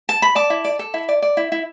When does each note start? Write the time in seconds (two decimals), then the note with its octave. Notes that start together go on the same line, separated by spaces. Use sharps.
0.09 A5
0.22 B5
0.35 D5 A5 D6
0.50 E4
0.65 D5
0.79 A4
0.94 E4
1.09 D5
1.22 D5
1.37 E4
1.52 E4